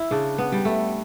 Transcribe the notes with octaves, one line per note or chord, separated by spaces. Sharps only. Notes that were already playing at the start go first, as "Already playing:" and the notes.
Already playing: E4
C#3 D4
B3
G3
A3